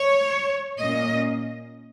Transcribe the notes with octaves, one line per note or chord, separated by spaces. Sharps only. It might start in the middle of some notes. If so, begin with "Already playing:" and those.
Already playing: C#5
A#2 A#3 C#4 D#5